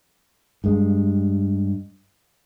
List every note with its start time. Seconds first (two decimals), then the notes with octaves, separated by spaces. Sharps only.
0.64 G2 G#3